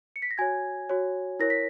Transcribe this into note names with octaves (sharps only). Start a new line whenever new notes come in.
C#7
B6
A#6
F#4 C#5 G#5 G#6
F#4 C#5
E4 A#4 C#5 A#6
B6